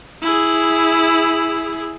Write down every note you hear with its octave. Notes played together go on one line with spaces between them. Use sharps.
E4 G#4